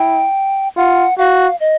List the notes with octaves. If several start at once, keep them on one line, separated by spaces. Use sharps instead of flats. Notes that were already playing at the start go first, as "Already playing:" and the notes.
Already playing: E4 G5
F4 F#5
F#4 F5
D#5